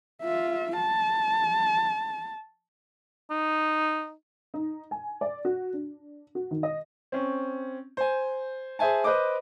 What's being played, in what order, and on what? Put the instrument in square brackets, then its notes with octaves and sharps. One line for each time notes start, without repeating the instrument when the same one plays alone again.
[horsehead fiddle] F4 E5
A5
[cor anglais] D#4
[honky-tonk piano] D#4
G#5
D5
F#4
D4
F#4
D#3
D#5
[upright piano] C4 C#4
C5 G#5
G#4 C5 E5 G#5 A5
B4 C5 D#5 D6